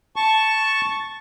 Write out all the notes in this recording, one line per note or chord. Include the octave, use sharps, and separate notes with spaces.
A5 C#6